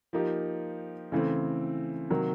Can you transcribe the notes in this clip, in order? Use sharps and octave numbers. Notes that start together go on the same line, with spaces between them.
F3 A#3 D#4 G4
C#3 E3 A3 C4
C3 D#3 F#3 A#3